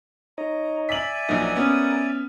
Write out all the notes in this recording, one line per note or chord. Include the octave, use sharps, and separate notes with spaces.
D#4 C#5 D#5 A#5
D5 E5 G#5 B6 F#7
A#1 F#3 D#4 A#4 F#5 D#6
B3 C#4